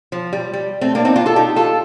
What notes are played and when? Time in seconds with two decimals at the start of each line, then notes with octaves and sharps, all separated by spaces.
0.12 F3
0.33 G3
0.54 G3
0.81 A3 C4
0.95 A#3 D4
1.05 C4 D#4
1.16 D4 F4
1.26 F4 A4
1.36 D#4 G4
1.56 F4 A4